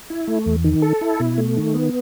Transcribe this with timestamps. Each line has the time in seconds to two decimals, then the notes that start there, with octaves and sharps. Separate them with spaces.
0.10 E4
0.28 A3
0.46 E2
0.64 D#3
0.82 A4
1.01 E4
1.20 B2
1.38 A3
1.57 D#3
1.74 B3